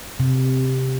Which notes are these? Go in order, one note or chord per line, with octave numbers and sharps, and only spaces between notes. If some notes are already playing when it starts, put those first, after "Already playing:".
C3